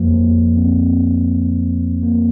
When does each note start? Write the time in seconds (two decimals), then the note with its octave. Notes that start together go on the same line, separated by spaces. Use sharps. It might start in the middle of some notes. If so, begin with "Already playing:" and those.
Already playing: F2 F3 A#3
0.57 C4
2.03 A#3